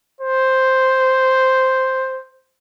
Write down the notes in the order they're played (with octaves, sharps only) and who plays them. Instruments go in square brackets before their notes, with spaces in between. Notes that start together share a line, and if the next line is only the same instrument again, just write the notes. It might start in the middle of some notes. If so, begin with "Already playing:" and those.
[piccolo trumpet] C5